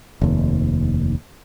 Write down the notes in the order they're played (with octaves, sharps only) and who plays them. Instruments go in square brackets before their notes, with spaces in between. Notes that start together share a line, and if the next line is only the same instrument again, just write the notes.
[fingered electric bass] F1 D#2